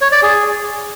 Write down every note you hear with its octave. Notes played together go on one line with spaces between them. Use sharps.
C#5
D5
G#4